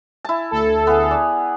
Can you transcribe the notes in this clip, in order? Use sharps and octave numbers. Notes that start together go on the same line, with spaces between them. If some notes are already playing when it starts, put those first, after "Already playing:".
E4 A5
D2 A4
B3 E4 G#4
D5